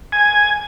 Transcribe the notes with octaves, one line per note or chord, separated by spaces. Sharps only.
G#5